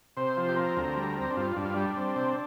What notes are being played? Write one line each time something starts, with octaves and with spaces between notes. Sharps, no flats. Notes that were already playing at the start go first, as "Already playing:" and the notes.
C3 C5
F3
G4
C4 A#4
D2
G3
C4
D4
G2 F4
G2 D4
F4
G3 D4
C4
C3